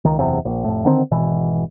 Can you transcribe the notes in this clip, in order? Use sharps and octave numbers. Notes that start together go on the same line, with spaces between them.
C#2 D#3
F#1 E2 C3
A#1
F1 A2
D3 D#3 C4
G#1 B2 E3